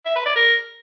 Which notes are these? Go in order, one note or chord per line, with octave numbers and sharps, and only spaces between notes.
E5
B4
D5
A#4